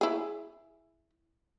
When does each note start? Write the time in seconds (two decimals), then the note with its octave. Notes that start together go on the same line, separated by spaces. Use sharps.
0.01 E4 G#4